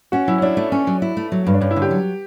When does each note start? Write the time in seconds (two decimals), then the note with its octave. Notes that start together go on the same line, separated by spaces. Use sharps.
0.12 C#4 F#4
0.28 F#3 E4
0.38 C#4
0.42 D4 E4
0.57 A3
0.72 C#4
0.87 F#3
1.02 E4
1.17 A3
1.32 F#3
1.47 G2
1.54 D4
1.61 G2 C#4
1.71 E4
1.76 D3
1.82 G4
1.91 F#3